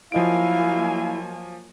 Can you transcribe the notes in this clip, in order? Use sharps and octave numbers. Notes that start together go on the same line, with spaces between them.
F3 F#3 A#3 E4 D#5 F5 G#5 D7